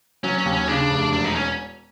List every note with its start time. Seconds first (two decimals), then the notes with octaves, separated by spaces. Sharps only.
0.24 F#3 C#4
0.38 C#4
0.45 D#2
0.53 C#4
0.68 C#3 D4
0.90 F1
1.13 E1 D4
1.24 D#4
1.35 C#4